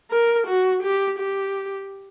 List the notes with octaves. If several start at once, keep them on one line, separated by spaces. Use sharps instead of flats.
A#4
F#4
G4
G4